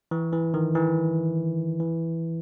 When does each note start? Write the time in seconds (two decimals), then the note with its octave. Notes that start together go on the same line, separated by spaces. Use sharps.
0.11 E3
0.33 E3
0.54 D#3
0.75 E3
1.80 E3